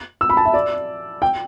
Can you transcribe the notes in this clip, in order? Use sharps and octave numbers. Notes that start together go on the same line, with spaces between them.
E6
B5
A5
E5
D5
G5